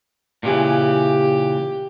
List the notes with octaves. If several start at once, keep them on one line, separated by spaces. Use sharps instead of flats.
A#2 C#3 E3 G4